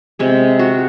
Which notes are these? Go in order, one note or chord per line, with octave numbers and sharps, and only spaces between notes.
C3 G#3 G#4
F#4